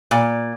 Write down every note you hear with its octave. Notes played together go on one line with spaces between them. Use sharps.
A#2